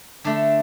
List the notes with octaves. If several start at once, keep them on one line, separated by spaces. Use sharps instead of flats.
D3 A3 D4